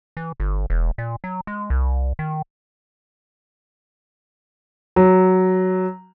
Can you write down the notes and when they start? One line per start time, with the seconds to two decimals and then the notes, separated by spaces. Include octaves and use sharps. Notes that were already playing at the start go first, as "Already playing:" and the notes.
0.17 E3
0.40 G1
0.70 E1
0.98 A#2
1.24 F#3
1.47 G#3
1.70 C2
2.19 D#3
4.96 F#3